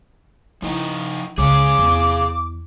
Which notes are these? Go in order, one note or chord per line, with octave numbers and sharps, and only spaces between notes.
F3 D#4 E4 D#5
C#2 G#4 C#5 F5 D6
E2